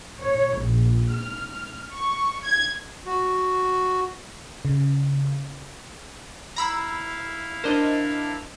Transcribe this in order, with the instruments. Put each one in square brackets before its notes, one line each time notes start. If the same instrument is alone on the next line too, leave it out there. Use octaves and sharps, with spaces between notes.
[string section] C#5
A#1
F6
C#6
G#6
[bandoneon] F#4
[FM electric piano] C#3
[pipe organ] E4 F5 [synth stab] A#5 B5 E6
[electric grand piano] D4 A#4 [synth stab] C5 D#5